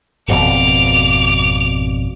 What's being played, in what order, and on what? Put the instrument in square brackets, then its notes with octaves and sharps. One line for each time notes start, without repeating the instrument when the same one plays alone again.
[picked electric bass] G#1 F2 B2 [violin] D6 F7